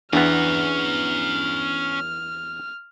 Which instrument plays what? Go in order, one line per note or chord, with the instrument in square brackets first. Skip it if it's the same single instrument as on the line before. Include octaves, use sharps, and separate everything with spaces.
[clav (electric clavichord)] E2 E3 B3 [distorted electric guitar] C#4 A#5 [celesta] D4 [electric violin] F6